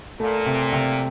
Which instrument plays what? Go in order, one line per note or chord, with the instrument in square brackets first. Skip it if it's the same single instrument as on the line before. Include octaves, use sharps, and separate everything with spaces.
[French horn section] A#2 [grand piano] A3
[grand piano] C3
C3